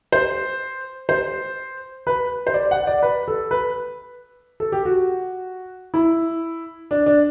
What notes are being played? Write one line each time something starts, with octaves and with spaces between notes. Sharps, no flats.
C5
C5
B4
C5
D5
F#5
D5
B4
A4
B4
A4
G4
F#4
E4
D4
D4